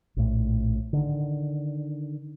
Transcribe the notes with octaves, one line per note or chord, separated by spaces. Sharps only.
A#1 A2
D3 D#3